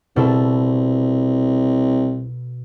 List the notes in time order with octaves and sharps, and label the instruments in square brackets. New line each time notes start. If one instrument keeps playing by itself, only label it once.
[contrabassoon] C2 [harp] B2 A4